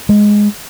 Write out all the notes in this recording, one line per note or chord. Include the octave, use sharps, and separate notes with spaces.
G#3